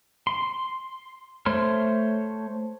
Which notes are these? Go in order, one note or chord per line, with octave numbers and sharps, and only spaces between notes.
C6
A3 C5 C#5 C6 F6